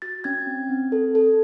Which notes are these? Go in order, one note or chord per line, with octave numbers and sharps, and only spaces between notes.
F#4 A6
C#4 G#6
C4
C4
A4
A4